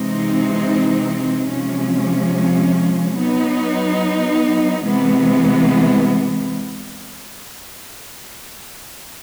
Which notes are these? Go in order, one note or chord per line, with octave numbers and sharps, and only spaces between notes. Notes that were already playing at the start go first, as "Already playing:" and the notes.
Already playing: C3 E3 G#3 C4 D#4
C3 F3 G#3 C#4
F#3 B3 D#4
C3 E3 G#3 B3